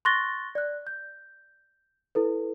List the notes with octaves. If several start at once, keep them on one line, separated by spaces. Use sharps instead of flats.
C6 C#6 F#6 A6 A#6 G7
D5 F#6
G6
E4 A4 B4